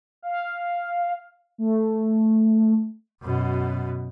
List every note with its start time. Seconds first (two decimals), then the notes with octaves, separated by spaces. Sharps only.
0.22 F5
1.58 A3
3.22 F#2 B2